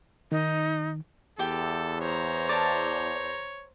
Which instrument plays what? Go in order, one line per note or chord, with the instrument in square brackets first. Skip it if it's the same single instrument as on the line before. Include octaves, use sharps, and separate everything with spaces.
[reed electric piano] D#3 [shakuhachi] D#4
[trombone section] E2 [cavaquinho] G4 G5 [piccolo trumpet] A4
[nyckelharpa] C5 A#5 [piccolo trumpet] C#5
[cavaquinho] D5 A5